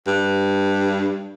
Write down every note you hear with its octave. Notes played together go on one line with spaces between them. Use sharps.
G2